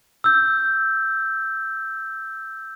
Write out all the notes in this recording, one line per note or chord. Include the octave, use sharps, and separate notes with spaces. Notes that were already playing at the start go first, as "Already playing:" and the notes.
E6 G6